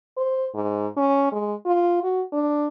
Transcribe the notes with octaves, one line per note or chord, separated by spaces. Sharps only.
C5
G#2
C#4
G#3
F4
F#4
D4